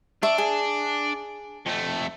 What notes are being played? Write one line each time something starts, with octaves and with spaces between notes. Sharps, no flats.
D4 E5 C#6
G#4
F2 A3